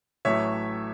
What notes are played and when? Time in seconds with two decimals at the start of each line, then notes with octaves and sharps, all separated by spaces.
0.25 A1 A2 F#3 A3 C#5 E5